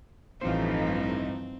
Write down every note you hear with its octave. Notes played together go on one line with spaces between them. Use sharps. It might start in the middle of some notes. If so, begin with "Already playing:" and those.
A1 G2 E3 F3 A3 C4 D#4 C5